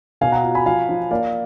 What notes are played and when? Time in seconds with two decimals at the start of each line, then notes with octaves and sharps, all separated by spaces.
0.21 B2 F5 G#5
0.32 F#5 A#5
0.43 F4
0.55 G#5 B5
0.66 F3 F5 G#5
0.89 F3
1.11 A#3 D5 F5